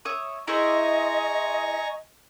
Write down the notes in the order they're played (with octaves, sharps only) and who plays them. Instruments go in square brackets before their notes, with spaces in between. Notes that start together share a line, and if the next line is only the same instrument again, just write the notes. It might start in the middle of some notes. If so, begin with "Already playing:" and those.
[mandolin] C#5 E5 D#6
[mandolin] E4 G#4 C5 [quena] D#5 [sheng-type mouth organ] G#5 A#5 C#6